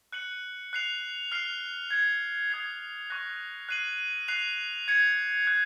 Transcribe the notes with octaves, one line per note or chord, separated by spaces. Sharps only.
F#6 C#7 F#7
F#6 C7 F7
F6 C7 F7
G#6 C#7 F7
D#6 G#6 C7 F7
C#6 F#6 A#6
F#6 C7 D#7 F#7
F#6 C7 F7
G#6 C#7 F7
F#6 C#7 F7